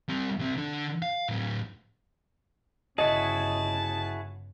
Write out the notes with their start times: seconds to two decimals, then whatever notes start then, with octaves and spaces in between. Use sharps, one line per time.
0.08 G3 C4
0.39 C2 C4
0.58 D3
1.02 F5
1.28 A2 F#3
2.98 G1 C#3 E4 F#4 G#4 D#5 A5